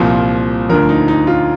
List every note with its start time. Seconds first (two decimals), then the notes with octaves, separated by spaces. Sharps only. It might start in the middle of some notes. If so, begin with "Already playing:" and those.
Already playing: C2 A#2 F3
0.69 D2 D3 F3 A#4
0.89 D#4
1.08 D#4
1.27 F4